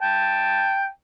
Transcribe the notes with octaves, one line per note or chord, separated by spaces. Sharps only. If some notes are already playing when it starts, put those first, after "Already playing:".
G5 A5